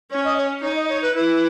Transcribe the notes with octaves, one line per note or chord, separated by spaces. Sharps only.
C#4 C#5
D#5
C#5
D#4 C#5
D#5
C#5
B4
E4 B4